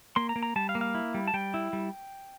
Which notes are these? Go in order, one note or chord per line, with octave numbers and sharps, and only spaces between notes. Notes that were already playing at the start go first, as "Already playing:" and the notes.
A#3 C6
A#5
A#3
A#5
G3 A5
F5
A#3
F5
E4
G3
A5
G3 G5
E4
G3